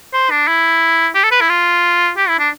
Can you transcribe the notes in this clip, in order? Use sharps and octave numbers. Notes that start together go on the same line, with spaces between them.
C5
D4
E4
G4
A4
B4
E4
F4
G4
E4
D4